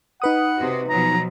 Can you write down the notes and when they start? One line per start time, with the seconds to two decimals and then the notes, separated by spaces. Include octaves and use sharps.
0.22 D#4 B4 F#5 D#6
0.57 C3 F#4
0.89 B2 F3 F#3 A#5